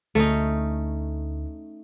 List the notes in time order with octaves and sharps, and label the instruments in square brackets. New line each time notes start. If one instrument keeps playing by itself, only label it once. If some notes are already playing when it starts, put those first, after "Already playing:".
[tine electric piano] D2 [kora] A3 C#4 D#4